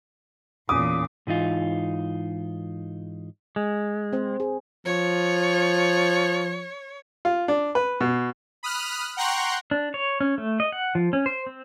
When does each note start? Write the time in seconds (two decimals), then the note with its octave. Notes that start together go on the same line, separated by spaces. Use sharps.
0.69 E2 A#2 C#4 D6 D#6
1.27 G#2 E3 D#4 F4
3.56 G#3
4.13 C4 C5
4.40 G#4
4.86 F3 C#5
7.25 F4
7.48 D4
7.75 B4
8.01 B2
8.63 B5 D#6 F6 F#6
9.17 F#5 G5 A#5 C6 C#6 F#6
9.71 D4
9.94 C#5
10.20 C#4
10.38 A3
10.60 D#5
10.72 F#5
10.95 F3
11.13 C#4
11.26 C5
11.47 C4